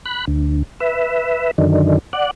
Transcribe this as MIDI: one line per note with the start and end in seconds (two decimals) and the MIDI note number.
0.06 0.25 83
0.06 0.25 90
0.28 0.63 38
0.80 1.51 71
0.80 1.51 76
1.58 1.98 42
1.58 1.98 50
1.58 1.98 51
2.13 2.31 74
2.13 2.31 78